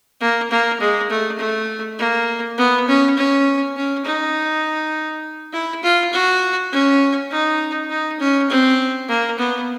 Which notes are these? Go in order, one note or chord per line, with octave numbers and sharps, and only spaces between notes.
A#3
A#3
G#3
A3
A3
A#3
B3
C#4
C#4
C#4
D#4
E4
F4
F#4
C#4
D#4
D#4
C#4
C4
A#3
B3